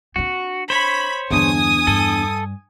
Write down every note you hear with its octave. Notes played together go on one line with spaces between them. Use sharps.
C4 D4 F#4
C5 C#5 B5
E2 G2 D3 D4 G#5 D#6
G2 A4